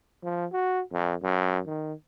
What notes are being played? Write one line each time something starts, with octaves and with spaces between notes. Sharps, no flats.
F3
F#4
F2
F#2
D#3